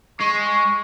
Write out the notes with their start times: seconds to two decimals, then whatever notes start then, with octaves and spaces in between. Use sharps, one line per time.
0.21 G#3 C#6